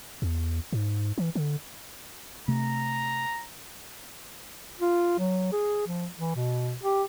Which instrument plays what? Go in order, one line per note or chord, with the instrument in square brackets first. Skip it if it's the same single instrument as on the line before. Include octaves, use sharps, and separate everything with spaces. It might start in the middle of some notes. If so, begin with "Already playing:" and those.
[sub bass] E2
G#2
E3
D3
[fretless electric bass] C3 A3 [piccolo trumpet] A#5
[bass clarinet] F4
F#3
G#4
F3
E3
B2
G4